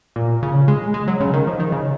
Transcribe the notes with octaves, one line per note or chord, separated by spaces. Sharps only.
A#2
C#3
G#3
G#3
F#3
C#3
D#3
F3
D#3
C#3